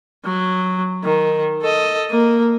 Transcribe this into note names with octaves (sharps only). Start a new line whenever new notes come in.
F#3
D#3
A4 D#5
A#3